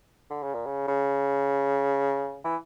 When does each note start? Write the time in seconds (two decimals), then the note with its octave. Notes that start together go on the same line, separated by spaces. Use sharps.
0.30 D3
0.43 C#3
0.54 A#2
0.66 C#3
0.87 C#3
2.44 E3